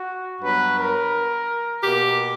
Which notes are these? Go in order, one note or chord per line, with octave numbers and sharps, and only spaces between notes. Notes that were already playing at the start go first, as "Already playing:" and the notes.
Already playing: F#4
G2 F#3 B3 B4
A#4
B2 A#3 G4